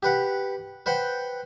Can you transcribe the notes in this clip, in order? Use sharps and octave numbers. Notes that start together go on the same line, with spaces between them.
G4 B4 F#5
B4 C5 F#5 G5